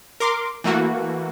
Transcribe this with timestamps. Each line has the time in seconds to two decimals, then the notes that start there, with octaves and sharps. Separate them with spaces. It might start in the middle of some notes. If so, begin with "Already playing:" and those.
0.20 A#4 C6 D6
0.64 E3 A3 A#3 F#4